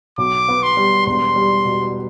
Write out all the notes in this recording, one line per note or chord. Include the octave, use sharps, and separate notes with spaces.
B1 D6
B3
C6
G3
E1 C6
G3
B2